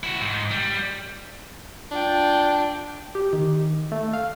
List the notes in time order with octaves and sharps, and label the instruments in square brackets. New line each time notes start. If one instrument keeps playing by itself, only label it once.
[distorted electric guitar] E4 F#4
G#2
G3
[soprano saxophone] D4 [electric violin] F4 G5
[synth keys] G4
D#3
A3
F5